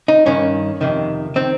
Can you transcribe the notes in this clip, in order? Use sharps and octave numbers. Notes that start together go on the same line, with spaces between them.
D#4
G2 D#3 C#4
F2 C3 D#3
D#3 C4